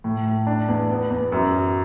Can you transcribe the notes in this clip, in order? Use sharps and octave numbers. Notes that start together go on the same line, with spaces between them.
A2
A2
D4
E2
B3
E2
F#2
F#3